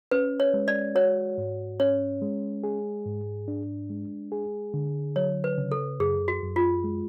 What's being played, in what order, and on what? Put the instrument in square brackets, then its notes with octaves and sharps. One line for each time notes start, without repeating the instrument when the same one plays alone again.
[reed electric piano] C#4 [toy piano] B4
[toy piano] C#5
[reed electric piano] G#3
[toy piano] D5
[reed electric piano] F#4 [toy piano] C#5
[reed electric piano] G#2
[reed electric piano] C#4 [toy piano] C#5
[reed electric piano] G#3
G#4
G#2
D4
G#3
G#4
D3
[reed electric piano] F#3 [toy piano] C#5
[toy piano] B4
[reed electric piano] C#3
[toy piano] A4
[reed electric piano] F#2 [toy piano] G#4
[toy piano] F#4
[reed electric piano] F#2
[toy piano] F4
[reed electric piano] G#3